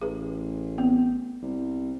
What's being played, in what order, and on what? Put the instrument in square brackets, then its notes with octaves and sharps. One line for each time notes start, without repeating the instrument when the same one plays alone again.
[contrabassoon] A1 [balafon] G#4 B4
[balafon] B3 C4
[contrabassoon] C2